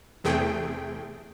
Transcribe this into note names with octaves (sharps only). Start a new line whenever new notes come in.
E2 C3 A3 G#4 G5